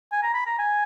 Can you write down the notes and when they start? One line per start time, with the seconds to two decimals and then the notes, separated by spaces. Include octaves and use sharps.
0.12 G#5
0.23 A#5
0.34 B5
0.46 A#5
0.59 G#5